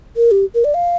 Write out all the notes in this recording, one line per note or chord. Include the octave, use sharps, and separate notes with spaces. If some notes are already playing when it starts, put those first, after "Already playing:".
A#4
G4
A#4
D5
F5